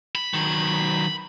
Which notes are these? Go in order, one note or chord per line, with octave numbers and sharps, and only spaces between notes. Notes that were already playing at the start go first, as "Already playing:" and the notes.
B5
D#3 F#3